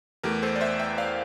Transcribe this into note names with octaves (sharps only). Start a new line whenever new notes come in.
E2 E3 A3 G4 A#4
A4 C5
D5
C5 E5
E5 G5
D5 F5